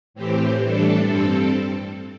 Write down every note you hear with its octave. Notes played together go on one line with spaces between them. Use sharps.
A2 E3 C4 G4
A2 E3 G3 D4 A4
G2 G3 C4 A4